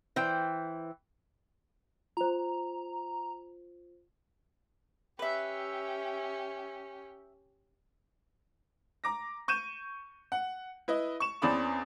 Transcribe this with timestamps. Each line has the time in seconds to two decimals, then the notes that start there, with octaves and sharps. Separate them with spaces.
0.16 E3 C5 G5
2.17 F4 C5 A#5
5.19 C#4 G4 B4 E5
9.04 A#5 D6 A#6
9.48 C#6 G6 D#7 E7
10.32 F#5
10.88 E4 B4 D#5
11.20 C#6 E7
11.42 E2 C4 C#4 D5 B5 D#6